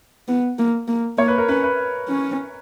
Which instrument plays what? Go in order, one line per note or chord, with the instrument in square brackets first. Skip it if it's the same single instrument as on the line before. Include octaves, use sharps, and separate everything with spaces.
[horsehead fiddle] B3
A#3
A#3
[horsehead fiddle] A#3 [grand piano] C#5
[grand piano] B4
A#4
[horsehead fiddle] C#4 [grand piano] B4
[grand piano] B4
[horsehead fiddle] C#4